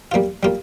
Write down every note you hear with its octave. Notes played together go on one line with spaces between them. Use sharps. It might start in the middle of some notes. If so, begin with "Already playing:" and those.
G3 A#3 F4
G3 A#3 F4